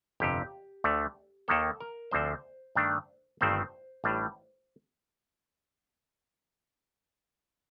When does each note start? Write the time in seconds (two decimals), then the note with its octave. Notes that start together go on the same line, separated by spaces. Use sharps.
0.20 G1 F2 C3 G4
0.84 D2 D3 A3
1.48 D#2 D#3 A#3 A4
1.80 A#4
2.11 D2 D3 F3 C4 C5
2.75 G2 D#3 A3 D4
3.41 G1 G2 D#3 A3 C4 C5
4.04 A1 A2 G3 D4